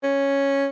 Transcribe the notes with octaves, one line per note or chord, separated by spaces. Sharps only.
C#4